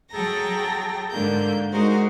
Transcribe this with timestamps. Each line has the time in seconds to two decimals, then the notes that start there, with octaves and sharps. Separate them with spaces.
0.11 F#3 G#4 A4 G5 A#5 A#6
1.10 G#2 D3 A#3 G6
1.71 G#3 D#4 F#4 G#4 A#4 C5